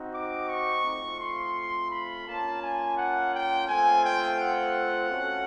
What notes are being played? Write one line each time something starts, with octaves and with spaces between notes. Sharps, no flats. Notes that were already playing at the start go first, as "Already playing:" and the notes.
Already playing: C4 D#4 F#4
D6
C#6
A3 C4 F4
C6
B5
A#3 C#4 F4 A5
G#5
F#5
G5
A3 C4 F4 G#5
G5
F#5
A3 C#4 F#4